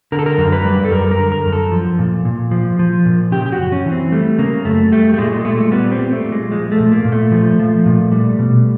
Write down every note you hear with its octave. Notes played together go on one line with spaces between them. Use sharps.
D3 A#4
A4
A#4
F#2
B4
G3
A4
F#2 A#4
A#4
D3
A#4
F#2
A4
F3
A#2
A#2
F3
F3
A#2
C#3 G4
G4
F#4
F#2
C#4
E3
C4
G3 A3
C#3 A#3
F#2 A3
G3 A3
A3
A#2 G#3
A#2 A3
G3 B3
C4
G3
A3
A#2
G#3
F3 G#3
A3
A#2
A#3
A#2
A3
F3
F3
A#2
G3
B2